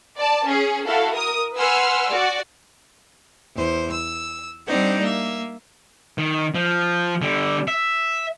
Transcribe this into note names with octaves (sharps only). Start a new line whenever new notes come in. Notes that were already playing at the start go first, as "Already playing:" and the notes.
D5 A5
C#4 G#4
E4 F#4 A4 F5
A#4 D#6
B4 F#5 G#5 C6 E6 F6
F#4 D5
E2 C5
E6
G3 C4 D4 D#4 D5 F#5
A#3 E5
D#3
F3
D3 G3
E5